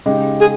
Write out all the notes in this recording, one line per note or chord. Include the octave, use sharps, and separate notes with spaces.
C#3 G#3 D#4 G4
G#4